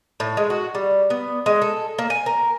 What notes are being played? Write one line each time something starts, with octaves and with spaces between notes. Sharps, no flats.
A2
G#3
F#4
G3
B3
G#3
A4
A#3
G#5
A#4